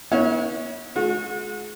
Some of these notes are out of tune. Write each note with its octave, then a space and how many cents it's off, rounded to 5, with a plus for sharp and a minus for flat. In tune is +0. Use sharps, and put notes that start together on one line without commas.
B3 -40 E4 -45 C#5 +0
G#3 +40 F#4 -35